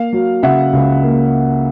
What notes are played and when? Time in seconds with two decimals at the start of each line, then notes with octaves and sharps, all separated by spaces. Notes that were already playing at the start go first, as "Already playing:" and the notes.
Already playing: A#3 F5
0.13 F#3
0.43 C#3 E5 F#5
0.73 C#2
1.03 A#3